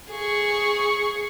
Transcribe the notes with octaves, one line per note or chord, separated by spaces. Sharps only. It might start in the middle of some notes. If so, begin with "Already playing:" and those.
G#4 C#6